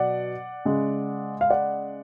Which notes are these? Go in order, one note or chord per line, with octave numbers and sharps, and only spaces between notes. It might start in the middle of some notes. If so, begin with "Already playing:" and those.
Already playing: B2 F#3 D5 F#5
C#3 G#3
F5
D5 F#5